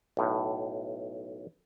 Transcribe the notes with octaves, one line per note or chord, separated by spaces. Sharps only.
B1 A2